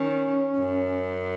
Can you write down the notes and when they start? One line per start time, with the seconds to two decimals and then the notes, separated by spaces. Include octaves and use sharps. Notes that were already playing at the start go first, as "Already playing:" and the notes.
Already playing: D#3 C#4
0.57 F#2